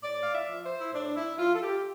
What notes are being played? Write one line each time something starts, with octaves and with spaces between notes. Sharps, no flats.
A2 D5
F5
E5
F3
C5
E4
A2 D4
E4
F3 F4
A4
G4